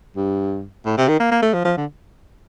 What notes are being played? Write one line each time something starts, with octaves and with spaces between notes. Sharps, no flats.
G2
A2
C3
D#3
A#3
A#3
A3
F3
F3
D3